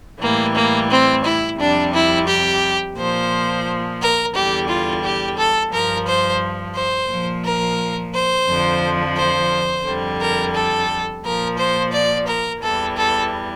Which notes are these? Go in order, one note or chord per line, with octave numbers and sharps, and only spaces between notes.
A2 E3 G3 A#3
A#3
C4
E4
F2 C3 G3 D4
E4
G4
A#2 F3 C5
A#4
E2 D3 G3 G4
F4
G4
A4
G2 F3 A#4
C5
C5
A#2 F3
A#4
C5
F2 D3 F3
C5
F2 D3 G3
A#4
A4
A#2 F3 A#4
C5
D5
A#4
E2 E3 G3 A4
A4